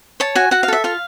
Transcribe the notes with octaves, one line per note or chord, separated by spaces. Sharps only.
C#5 A5
F#4 G#5
F#4 F#5
F5
A4 E5
F4 F5